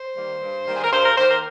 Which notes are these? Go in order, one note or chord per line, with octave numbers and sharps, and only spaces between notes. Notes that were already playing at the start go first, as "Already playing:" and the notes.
Already playing: C5
D#3 G3 A#3
G2
D#3 G3 A#3
G#4
A#4
G2 C5
A#4
D#3 A#3 C5
A#4